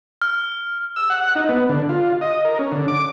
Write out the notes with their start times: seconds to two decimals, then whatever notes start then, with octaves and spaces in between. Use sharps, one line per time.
0.22 F6
0.96 E6
1.10 F#5
1.35 D#4
1.49 B3
1.69 D3
1.89 F4
2.21 D#5
2.45 A#4
2.59 C#4
2.72 D3
2.88 D6